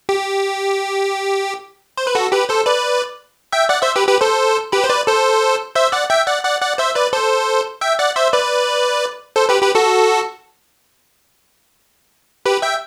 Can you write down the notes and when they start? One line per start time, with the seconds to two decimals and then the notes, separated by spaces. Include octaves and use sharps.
0.09 G4
1.97 C5
2.07 B4
2.15 F#4 A4
2.32 G4 B4
2.49 A4 C5
2.66 B4 D5
3.52 E5 G5
3.69 D5 F#5
3.82 C5 E5
3.96 G4 B4
4.08 G4 B4
4.21 A4 C5
4.72 G4 B4
4.84 C5
4.89 B4 D5
5.07 A4 C5
5.75 C5 E5
5.92 D5 F#5
6.10 E5 G5
6.27 D5 F#5
6.45 D5 F#5
6.61 D5 F#5
6.78 C5 E5
6.95 B4 D5
7.13 A4 C5
7.81 E5 G5
7.99 D5 F#5
8.16 C5 E5
8.33 B4 D5
9.36 A4 C5
9.49 G4 B4
9.62 G4 B4
9.75 F#4 A4
12.46 G4 B4
12.62 E5 G5